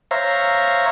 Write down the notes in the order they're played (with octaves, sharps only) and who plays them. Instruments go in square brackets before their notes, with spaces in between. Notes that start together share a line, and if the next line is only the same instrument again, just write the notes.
[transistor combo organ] C5 C#5 E5 F5 A#5